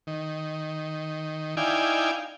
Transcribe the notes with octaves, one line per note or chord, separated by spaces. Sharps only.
D#3
D#4 E4 D5 F5 G5 G#5